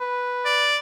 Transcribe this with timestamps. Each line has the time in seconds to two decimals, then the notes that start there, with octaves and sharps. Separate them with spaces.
0.01 B4
0.45 D5